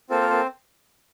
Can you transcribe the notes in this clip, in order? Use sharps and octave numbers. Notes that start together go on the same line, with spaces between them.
A#3 C4 F4 A4 C5
A#4
C4 C5